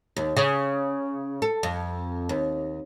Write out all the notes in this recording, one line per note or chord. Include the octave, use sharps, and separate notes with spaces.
D#2
C#3
A4
F2
D#2